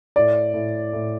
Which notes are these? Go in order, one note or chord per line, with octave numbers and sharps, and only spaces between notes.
A2 D5
A2
A2